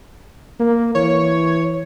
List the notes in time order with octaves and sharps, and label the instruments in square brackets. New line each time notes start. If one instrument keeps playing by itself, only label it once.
[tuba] A#3
[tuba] E3 [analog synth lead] C#5